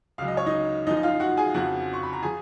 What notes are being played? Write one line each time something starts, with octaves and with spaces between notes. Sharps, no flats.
C#2 C#3 F#3 F5
D#5
C#5
D#4 D#5
F#2 F3 D#4 D#5
D#5
F4 F5
F#4 F#5
G#4 G#5
F2 C#3 F3 F#4 F#5
C#6
B5
A#5
F3 G#4 G#5